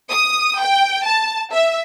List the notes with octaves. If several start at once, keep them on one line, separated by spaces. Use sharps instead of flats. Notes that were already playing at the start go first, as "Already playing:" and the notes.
D#6
G5
A5
E5